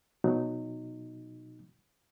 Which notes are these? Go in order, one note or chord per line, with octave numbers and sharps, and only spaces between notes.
B2 F#3 D#4